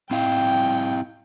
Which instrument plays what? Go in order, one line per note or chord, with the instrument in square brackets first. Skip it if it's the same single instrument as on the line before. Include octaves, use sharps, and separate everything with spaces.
[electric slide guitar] C4 E4 F5 [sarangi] G5